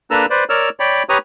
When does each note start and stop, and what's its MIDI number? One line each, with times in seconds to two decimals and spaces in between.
0.11 0.26 58
0.11 0.26 62
0.11 0.26 69
0.11 0.26 71
0.11 0.26 82
0.11 0.26 88
0.30 0.44 71
0.30 0.44 72
0.30 0.44 74
0.49 0.69 70
0.49 0.69 73
0.49 0.69 74
0.49 0.69 88
0.49 0.69 89
0.80 1.03 73
0.80 1.03 74
0.80 1.03 79
0.80 1.03 83
1.09 1.18 67
1.09 1.18 71
1.09 1.18 73
1.09 1.18 82
1.09 1.18 85
1.09 1.18 87